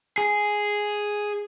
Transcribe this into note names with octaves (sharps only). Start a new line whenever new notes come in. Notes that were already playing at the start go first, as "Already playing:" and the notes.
G#4